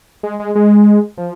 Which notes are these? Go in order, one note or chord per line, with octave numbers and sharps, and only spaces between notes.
G#3
G#3
G#3
F3